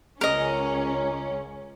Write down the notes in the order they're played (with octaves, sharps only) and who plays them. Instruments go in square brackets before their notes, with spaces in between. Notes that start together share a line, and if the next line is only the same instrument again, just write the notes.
[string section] C#2 C#4 [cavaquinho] A#4 D#5